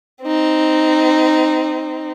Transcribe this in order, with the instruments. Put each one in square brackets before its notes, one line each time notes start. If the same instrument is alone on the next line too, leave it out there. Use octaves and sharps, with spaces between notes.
[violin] C4 D#4